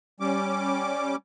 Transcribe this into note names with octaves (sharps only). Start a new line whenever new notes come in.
G3 C#4 D6